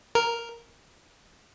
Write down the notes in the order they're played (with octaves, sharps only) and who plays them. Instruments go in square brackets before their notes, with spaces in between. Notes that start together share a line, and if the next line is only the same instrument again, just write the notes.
[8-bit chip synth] A#4